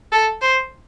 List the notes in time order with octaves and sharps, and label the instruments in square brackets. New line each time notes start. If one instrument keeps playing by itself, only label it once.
[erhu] A4
C5